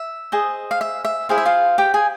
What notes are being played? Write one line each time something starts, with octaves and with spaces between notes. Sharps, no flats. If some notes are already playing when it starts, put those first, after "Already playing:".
Already playing: E5
G#4 C5 D#5
F5
E5
E5
E4 G#4 C5 F5
E5
F4 F5
G4 G5
G#4 G#5